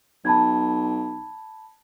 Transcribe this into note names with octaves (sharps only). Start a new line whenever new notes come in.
B1 A5 B5 G#6